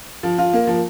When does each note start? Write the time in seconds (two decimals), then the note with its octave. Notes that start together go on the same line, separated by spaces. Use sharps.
0.23 F3
0.38 F4
0.53 A#3
0.67 F3